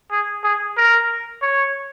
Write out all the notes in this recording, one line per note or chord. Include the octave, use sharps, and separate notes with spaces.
G#4
G#4
A#4
C#5